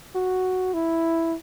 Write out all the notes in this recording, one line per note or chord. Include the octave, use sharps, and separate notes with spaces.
F#4
E4